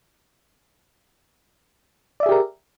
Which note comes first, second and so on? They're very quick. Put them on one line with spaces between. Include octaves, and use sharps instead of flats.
D5 E5 G#4 G4 A#4